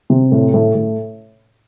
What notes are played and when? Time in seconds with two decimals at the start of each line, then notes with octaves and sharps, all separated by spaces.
0.10 C3
0.32 A2
0.54 A2
0.75 A2